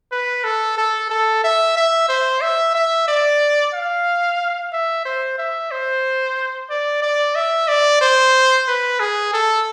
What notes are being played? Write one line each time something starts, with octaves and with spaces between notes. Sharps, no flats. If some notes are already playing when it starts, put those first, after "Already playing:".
B4
A4
A4
A4
E5
E5
C5
E5
E5
D5
F5
E5
C5
E5
C5
D5
D5
E5
D5
C5
B4
G#4
A4